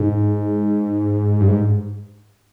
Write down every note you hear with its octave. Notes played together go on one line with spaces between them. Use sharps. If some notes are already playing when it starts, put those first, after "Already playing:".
Already playing: G#2
G2
G#2